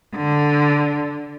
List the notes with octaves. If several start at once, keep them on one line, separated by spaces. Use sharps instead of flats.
D3